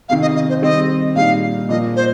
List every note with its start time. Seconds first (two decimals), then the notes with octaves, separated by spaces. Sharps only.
0.09 F2 C3 D#3 F5
0.22 D#5
0.36 D#5
0.49 C5
0.62 D#3 G3 C4 D#5
1.15 A#2 G3 D#4 F5
1.69 A#2 F3 A#3 D#5
1.96 C5